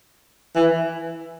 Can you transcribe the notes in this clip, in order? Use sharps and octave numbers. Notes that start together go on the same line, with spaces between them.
E3